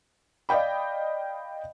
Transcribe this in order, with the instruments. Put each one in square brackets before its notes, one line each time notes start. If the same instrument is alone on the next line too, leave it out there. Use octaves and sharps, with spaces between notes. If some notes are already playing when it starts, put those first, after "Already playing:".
[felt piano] D5 D#5 F5 G5 B5